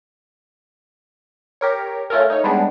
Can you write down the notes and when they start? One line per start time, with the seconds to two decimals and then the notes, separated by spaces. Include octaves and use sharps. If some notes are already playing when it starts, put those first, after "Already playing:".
1.61 G4 A#4 C#5
2.10 A3 C#4 F4 A4 A#4
2.30 D#4 C#5
2.44 G3 G#3 B3 D4